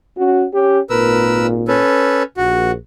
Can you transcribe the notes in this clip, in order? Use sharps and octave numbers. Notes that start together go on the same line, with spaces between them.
C#4 F#4
C#4 G4
G#1 A#2 A#4 B4 E6
C#4 A4 B4
A#1 F#4